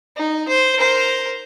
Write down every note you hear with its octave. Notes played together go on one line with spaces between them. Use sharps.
D#4
C5
A#4 C5